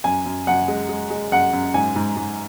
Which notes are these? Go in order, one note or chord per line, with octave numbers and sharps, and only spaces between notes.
F#2 G#5
F#2
F#2 F#5
G#3
G#3
G#3
F#2 F#5
F#2
G#2 G#5
G#2
G#2